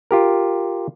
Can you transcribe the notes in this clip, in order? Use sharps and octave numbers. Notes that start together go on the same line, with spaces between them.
F4 G4 A#4